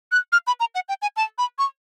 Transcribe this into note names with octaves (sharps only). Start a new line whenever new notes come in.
F#6
F6
B5
A#5
F#5
G5
G#5
A5
B5
C#6